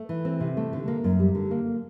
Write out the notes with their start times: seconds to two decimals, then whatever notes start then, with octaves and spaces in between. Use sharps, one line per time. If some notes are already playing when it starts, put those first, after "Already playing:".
Already playing: A3
0.09 E3
0.25 C4
0.40 C3
0.57 A3
0.73 D3
0.88 A#3
1.04 F#2
1.20 G3
1.35 D3
1.51 A#3